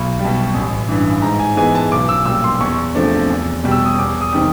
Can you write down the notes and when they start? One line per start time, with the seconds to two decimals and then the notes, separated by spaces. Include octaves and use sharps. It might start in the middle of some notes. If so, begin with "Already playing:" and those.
Already playing: B1 B5
0.19 G3
0.24 B2
0.54 A1
0.89 G2 E3
1.22 G#2 A#5
1.39 G#5
1.57 E3 G#3 B3 G#5
1.75 A5
1.92 B1 D6
2.09 E6
2.26 A#2 G3 E6
2.44 C6
2.61 E2 C#6
2.95 C3 F3 A3 D4
3.30 E2
3.64 B2 G3
3.71 E6
3.85 D#6
3.99 E2 D6
4.21 D#6
4.32 C3 D#3 G3